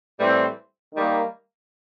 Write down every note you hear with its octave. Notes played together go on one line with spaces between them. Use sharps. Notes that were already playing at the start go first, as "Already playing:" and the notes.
A2 E3 G3 C4
D#3 G3 A#3